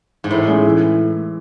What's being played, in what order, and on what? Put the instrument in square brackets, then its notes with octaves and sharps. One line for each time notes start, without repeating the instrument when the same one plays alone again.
[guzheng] G#2
[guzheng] A2 [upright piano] E3
[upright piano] G#3 C#4 E4 G#4
E3